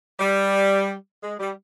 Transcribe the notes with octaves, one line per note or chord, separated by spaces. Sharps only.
G3
G#3
G3